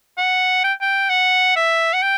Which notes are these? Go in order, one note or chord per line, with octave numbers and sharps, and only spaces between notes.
F#5
G5
G5
F#5
E5
F#5
G5